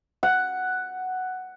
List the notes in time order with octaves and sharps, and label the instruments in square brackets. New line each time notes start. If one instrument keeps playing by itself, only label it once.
[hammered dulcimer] F#5